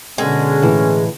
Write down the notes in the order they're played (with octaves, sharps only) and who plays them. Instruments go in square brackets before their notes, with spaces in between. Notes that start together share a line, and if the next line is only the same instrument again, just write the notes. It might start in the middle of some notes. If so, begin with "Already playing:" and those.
[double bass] B2 D3 [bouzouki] G#3 [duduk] C#4
[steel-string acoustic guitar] A2 E3